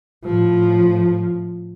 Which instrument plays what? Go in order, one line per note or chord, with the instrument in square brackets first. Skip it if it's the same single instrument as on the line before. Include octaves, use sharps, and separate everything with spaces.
[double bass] A2 F3